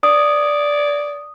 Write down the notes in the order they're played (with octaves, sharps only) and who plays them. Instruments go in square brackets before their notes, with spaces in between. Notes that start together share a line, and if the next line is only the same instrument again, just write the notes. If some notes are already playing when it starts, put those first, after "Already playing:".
[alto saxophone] D5 [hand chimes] D#6